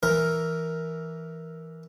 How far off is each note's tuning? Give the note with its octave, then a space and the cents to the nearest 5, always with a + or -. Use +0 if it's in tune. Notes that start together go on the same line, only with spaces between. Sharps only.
E3 +0 A#4 +0